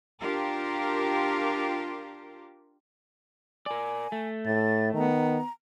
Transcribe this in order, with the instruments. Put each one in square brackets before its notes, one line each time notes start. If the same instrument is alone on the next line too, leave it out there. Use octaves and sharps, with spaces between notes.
[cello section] D4 F4 G4 A#4
[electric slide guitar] A#4 D5 [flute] G#5
[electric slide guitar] A3
[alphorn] A2 [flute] A6
[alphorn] D#3 [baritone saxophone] B3 [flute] A#5